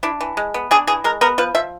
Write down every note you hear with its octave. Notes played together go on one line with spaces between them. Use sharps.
D4 E4
E3
G#3
B3
D4 G#4
E3 G#4
G#3 A#4
B3 A#4
F3 B4
F3 E5